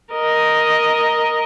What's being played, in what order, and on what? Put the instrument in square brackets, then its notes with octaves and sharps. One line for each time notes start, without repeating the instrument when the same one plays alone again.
[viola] A#4 D#5